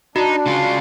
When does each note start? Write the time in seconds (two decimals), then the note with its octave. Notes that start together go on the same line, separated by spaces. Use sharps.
0.16 D4 D#4 F#4
0.46 C#3 F4